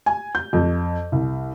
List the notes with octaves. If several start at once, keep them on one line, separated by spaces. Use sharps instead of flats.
G#5
G6
F2
C2